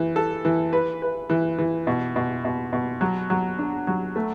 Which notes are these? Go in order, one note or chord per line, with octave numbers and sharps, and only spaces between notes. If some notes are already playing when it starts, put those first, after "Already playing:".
Already playing: E3
A4
E3
B4
B4
E3
E3
B2
B2
B2
B2
F#3
F#3
D4
F#3
A3